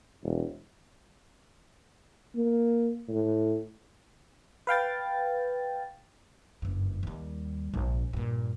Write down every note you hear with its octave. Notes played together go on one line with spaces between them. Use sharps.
E1
A#3
A2
B4 F5 G5 A6
F#1 G2
D#2 G3
A#1 G#2
G2 A#2